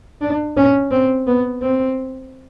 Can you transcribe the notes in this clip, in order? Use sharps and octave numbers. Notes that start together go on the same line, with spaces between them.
D4
C#4
C4
B3
C4